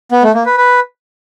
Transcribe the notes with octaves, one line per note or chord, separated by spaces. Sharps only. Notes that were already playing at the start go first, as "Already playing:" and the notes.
B3
A3
A#3
B4
B4